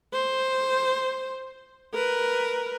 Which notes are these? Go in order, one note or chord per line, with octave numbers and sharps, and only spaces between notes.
C5
A#4 B4